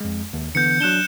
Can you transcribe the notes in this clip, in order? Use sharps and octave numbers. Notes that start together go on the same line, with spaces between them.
F2 G#3
D#2
D3 E3 B3 G6 C#7
F#3 D4 F#6 E7 G7